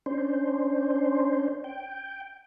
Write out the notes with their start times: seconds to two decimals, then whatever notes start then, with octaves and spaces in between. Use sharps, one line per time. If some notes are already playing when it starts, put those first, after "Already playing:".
0.06 C#4 D4 C5
1.64 G5